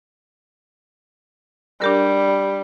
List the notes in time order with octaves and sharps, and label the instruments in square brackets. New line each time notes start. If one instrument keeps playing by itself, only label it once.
[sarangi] G3 [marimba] D4 G4 A#4